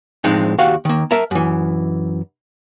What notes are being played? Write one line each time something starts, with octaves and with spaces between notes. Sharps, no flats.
A2 F3 G#3 C4 D4 D#4
D#2 F#4 G4 F5 F#5
D#3 A#3
A#4 E5 A5 A#5
F#2 E3